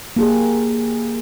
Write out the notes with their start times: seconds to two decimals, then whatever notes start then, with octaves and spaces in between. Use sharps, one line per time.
0.16 A#3 G4 G#4